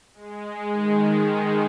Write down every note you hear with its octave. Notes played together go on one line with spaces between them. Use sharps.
G#3
D#3